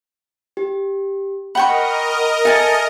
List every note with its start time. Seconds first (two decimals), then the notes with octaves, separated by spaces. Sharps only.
0.57 G4
1.55 A#4 D#5 F#5 G5 B5 C#6
2.45 A4 E5 G#5 A5